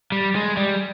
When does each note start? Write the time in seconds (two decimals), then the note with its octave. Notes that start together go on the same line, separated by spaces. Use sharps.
0.12 G3
0.35 G#3
0.57 G3